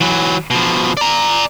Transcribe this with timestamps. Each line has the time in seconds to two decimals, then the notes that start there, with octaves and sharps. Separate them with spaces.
0.01 E3 F#3
0.50 B2 F3
0.97 D5 A#5